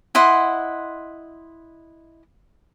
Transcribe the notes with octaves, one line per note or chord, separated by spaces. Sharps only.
E4 D#5 F#5 C6